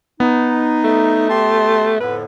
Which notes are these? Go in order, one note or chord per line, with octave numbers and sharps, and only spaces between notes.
B3 D#4
A3
G4 A5 C6
F2 A2 D3 B4